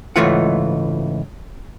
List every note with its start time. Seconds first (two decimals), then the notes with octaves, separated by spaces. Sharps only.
0.16 C#2 G#2 E3 A3 F4 F#5